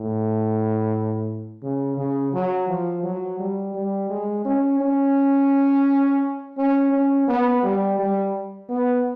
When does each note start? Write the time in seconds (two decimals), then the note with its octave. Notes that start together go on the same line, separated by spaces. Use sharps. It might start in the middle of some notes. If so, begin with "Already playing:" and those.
Already playing: A2
1.62 C#3
1.97 C#3
2.33 F#3
2.68 F3
3.03 F#3
3.39 G3
3.74 G3
4.10 G#3
4.45 C#4
4.80 C#4
6.58 C#4
6.92 C#4
7.28 B3
7.63 G3
7.99 G3
8.69 B3